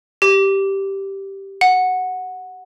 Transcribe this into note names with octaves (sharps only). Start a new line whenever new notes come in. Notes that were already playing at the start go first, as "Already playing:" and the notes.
G4
F#5